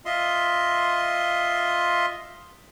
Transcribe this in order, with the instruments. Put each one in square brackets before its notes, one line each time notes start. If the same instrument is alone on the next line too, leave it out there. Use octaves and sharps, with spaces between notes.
[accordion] F4 D#5 E5 C6